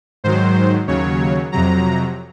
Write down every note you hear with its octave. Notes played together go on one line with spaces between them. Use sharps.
G#2 D#3 F#3 C5
D#2 C#3 F#3 C#5
F2 C3 F#3 A#5